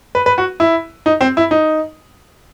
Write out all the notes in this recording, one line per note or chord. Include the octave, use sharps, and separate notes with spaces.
B4
B4
F#4
E4
D#4
C4
E4
D#4